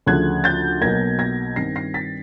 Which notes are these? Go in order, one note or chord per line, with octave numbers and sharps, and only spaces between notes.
D2 C#3 F3 A3 F#6 G#6
G6 A6
B1 B2 F#3 A#3 G#6 A#6
G#6 A#6
G2 D#3 G3 C4 A#6 C7
A#6 C7
A6 B6